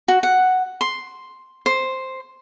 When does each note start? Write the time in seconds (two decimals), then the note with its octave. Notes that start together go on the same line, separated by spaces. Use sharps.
0.08 F#4
0.23 F#5
0.81 C6
1.66 C5